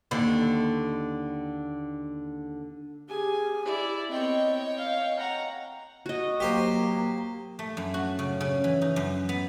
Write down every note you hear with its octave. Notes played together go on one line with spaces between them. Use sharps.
D#2 D3
G4 G#4 G#5
E4 D5
B3 C4 C#5 D#5 G5
F5
F#5 A#5
F#4 D#5
F#3 A#3 G4 C5
A3
F#2
F#4
C#3
C#3
E3
D#4
F#2
B3